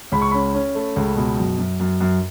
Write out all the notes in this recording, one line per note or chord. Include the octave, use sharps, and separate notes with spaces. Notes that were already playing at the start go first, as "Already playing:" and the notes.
C#2 B5
C#6
C#4 B5
C#4
A3
C#2
B2
F#2
F#2
F#2
F#2